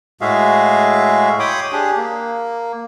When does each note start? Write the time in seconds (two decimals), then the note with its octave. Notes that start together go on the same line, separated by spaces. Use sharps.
0.21 A2 G#3 F#4 G#4 E5 F5
1.40 C#5 G5 B5 C6 D6 D#6
1.72 D4 G4 G#4
1.97 A#3